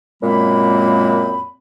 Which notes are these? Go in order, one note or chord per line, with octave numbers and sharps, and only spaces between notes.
F#2 A#2 G#3 A#3 C4 B5